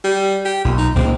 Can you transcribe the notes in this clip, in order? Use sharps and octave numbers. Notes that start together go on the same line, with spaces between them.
G3
G4
B1 A#2
D#4
C#2 A#2 G#3 C4